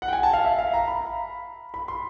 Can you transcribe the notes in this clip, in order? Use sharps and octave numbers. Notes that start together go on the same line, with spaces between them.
F#5
G5
G#5
A5
F5
E5
F5
A#5
B5
B5
C6